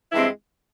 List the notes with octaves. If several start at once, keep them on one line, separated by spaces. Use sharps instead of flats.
G2 E3 G#3 C4 E4